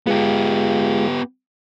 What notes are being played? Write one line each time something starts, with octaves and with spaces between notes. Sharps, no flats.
G#3 B3 F4 G4